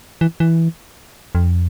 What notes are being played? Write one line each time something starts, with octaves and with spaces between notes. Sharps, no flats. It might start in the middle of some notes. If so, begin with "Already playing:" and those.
E3
E3
F2